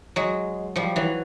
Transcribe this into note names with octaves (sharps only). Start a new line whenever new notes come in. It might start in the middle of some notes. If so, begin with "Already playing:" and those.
F#3 G#3
F3 G3
E3 F#3